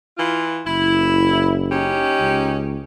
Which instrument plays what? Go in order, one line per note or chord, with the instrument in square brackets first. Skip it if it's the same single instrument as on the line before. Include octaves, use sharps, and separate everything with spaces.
[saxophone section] E3 F4
[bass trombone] F#1 [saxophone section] E4
[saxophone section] C#4 D#4 G4
[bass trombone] C#2